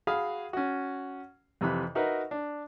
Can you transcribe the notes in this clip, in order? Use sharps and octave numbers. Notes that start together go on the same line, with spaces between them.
F#4 G#4 F5 B5 F6
C#4 F#4
F2 C3 E3 E4 B5 F#6
D#4 F#4 A#4 B4 E5
D4